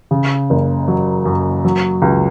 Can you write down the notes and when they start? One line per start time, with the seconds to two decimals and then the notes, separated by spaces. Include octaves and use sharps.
0.11 C#3
0.50 F#1
0.88 F#3
1.25 F#2
1.65 F#3
2.02 C#2